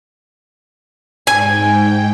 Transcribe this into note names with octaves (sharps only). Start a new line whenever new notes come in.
G#2 G5 G#5